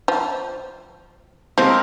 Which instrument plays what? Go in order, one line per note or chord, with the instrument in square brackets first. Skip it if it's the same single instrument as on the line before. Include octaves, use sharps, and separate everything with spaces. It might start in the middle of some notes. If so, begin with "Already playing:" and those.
[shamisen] F3
[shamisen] F3 [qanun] G#3 C4 G4 A#4